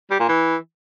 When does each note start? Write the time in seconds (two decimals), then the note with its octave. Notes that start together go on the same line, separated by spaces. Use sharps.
0.11 G3
0.20 A#2
0.29 E3